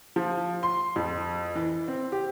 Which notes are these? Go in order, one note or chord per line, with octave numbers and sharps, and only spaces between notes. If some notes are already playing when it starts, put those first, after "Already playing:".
F3
C6
F2
E3
C4
G4